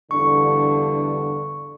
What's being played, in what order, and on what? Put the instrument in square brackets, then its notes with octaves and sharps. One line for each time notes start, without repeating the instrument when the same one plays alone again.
[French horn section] E2 G2 D3 [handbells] C#6